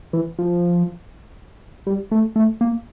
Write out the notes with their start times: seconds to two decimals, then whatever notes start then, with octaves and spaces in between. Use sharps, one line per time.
0.13 E3
0.39 F3
1.87 G3
2.11 A3
2.36 A3
2.61 A#3